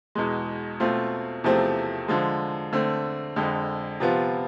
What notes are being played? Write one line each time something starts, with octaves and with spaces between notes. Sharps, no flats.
E2 B2 G#3
B2 A3 C4 F4
E2 C3 F3 A3 C4
D3 F3 G#3
D3 A3 C4
F2 D3 G#3
C3 F3 B3 F4